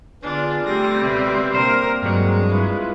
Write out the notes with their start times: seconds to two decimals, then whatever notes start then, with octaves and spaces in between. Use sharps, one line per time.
0.23 D3 B3 D4 F4 G#4
0.65 G3 A3 C4 G4 A#6
1.03 C#2 B2 B4 E5
1.55 A#3 C4 D4 A#4 C5
2.02 G2 F#3 G#3
2.51 E4 F4 B4